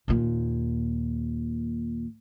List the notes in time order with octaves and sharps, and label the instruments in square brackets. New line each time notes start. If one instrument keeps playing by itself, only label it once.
[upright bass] D#2 A#2